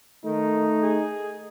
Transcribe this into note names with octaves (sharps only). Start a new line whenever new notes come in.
D#3 A3 D#4
G#4